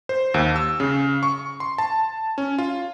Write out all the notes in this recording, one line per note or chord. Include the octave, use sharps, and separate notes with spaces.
C5
D#2
E6
C#3
C#6
C6
A5
C#4
F4